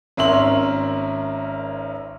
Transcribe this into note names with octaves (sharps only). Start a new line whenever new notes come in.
G#1 C#4 A#4 E5 C6 F#7